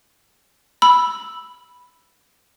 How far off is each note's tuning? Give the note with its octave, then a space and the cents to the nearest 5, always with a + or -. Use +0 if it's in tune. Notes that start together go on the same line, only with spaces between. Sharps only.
B5 +0 E6 +0